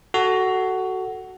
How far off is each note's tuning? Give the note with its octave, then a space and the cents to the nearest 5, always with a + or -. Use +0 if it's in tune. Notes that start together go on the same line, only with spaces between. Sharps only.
F#4 +15 A4 +0